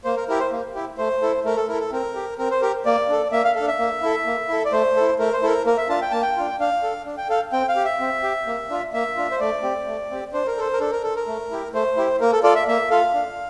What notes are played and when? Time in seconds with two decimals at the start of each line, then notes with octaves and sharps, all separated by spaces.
0.04 A#3 C5
0.17 A#4
0.28 E4 G4 A#4
0.40 C5
0.52 A#3
0.75 E4 G4
0.98 A3 C5
1.22 E4 A4
1.45 A3 A#4
1.56 A4
1.68 E4 A4 A#4
1.80 A4
1.92 C4 A#4
2.15 G4
2.38 C4 A#4
2.51 C5
2.61 G4 A#4
2.86 A#3 D5
3.09 D4 A4
3.32 A#3 E5
3.44 F5
3.55 D4 A4 F5
3.67 E5
3.79 A#3
4.02 E4 A4
4.26 A#3
4.48 E4 A4
4.65 D5
4.72 A3 C5
4.96 E4 A4
5.19 A3 A#4
5.33 C5
5.42 E4 A4 A#4
5.65 A#3 A#4
5.78 E5
5.89 D4 F4 A5
6.02 G5
6.11 A#3 A5
6.22 G5
6.36 D4 F4
6.59 D4 F5
6.83 A4
7.06 D4
7.17 G5
7.29 A4 F5
7.52 C4 G5
7.69 F5
7.76 G4
7.85 E5
8.00 C4
8.23 G4
8.47 A#3
8.70 D4 F4
8.93 A#3 E5
9.17 D4 F4
9.31 C5
9.40 A3 D5
9.63 C4 G4
9.87 A3
10.10 C4 G4
10.33 D4 C5
10.47 A#4
10.57 A4 C5
10.73 A#4
10.80 D4 A4
10.92 A#4
11.03 A4
11.16 A#4
11.28 A3
11.51 E4 G4
11.73 A3 C5
11.97 E4 G4
12.20 A#3 A#4
12.33 A4
12.43 F4 A4 D5
12.55 E5
12.68 A#3 E5
12.90 F4 A4 F5
13.14 D4